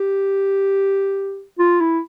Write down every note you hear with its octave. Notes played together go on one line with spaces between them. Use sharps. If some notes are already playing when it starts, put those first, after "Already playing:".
Already playing: G4
F4
E4